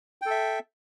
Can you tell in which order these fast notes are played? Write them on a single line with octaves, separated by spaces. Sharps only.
G5 A4 E5